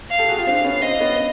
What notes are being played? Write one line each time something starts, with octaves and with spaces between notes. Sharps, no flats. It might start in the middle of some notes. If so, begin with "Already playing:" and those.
F5
G4 A4
F#4 G#4
F4 G4
C4 D4 F5
B3 C#4
C4 D#5
D4
B3 C#4